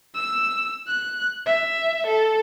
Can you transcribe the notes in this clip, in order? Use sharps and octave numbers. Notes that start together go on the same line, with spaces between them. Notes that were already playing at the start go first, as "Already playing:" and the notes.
E6
F#6
E5
A4